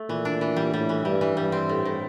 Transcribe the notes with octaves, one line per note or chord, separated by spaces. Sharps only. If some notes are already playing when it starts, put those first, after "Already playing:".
Already playing: A3
A#2 E3
D4
E3
G3
A2 G3
E3
G2 G3
E3
G2 G3
C4
A2
A2